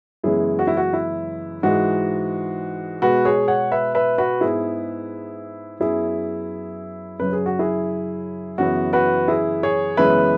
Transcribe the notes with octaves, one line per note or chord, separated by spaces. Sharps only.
F#2 C#3 E3 G#3 B3 E4 G#4
F#4
E4
F#4
E4
G#2 E3 G#3 F#4
B2 G#3 B3 F#4 B4
G#4 C#5
C#5 F#5
B4 E5
B4 E5
F#4 B4
G#2 G#3 B3 E4 G#4
F#2 F#3 B3 E4 G#4
F#2 C#3 F#3 B4
G#4
F#4
E4 G#4
F#2 C#3 E3 B3 F#4
F#4 B4
E4 G#4
G#4 C#5
F#2 C#3 E3 G#3 B3 B4 E5